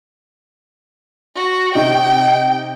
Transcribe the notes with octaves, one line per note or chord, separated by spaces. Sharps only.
F#4
C3 D#4 G5